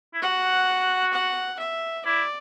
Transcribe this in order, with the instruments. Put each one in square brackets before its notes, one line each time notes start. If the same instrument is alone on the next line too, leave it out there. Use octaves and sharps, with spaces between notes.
[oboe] E4
[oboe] F#4 [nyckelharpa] F#5
[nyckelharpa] F#5
E5
[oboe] E4 [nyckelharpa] D5